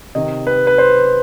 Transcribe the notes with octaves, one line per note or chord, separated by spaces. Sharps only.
C3 D#3 D#5
B4
B4
C5